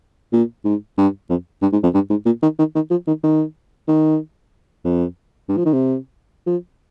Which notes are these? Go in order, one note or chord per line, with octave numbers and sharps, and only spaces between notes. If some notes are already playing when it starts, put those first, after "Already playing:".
A#2
G#2
G2
F2
G2
G#2
F2
G2
G#2
A#2
D#3
D#3
D#3
F3
D#3
D#3
D#3
F2
G2
F3
D#3
C3
F3